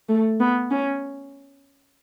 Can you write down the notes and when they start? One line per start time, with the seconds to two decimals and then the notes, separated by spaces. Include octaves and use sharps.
0.09 A3
0.40 B3
0.71 C#4